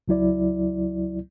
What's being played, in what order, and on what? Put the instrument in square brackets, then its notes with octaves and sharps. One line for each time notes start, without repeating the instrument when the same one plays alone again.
[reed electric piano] C#2 F#3 E4 D5